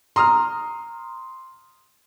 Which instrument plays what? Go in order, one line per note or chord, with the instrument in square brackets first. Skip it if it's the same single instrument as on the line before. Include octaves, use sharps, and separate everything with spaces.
[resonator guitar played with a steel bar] A#5 [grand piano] C6 D#6 F6